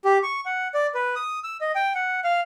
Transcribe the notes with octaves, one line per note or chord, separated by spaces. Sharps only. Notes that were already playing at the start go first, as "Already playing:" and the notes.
G4
C#6
F#5
D5
B4
D#6
E6
D#5
G5
F#5
F5